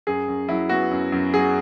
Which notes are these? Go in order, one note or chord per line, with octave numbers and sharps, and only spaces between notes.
F#2 G#4
F#2
F#3 E4
B3 F#4
F#2
F#2
F#3 G#4